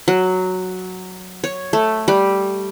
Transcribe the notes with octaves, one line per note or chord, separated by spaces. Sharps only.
F#3
C#5
A3
G3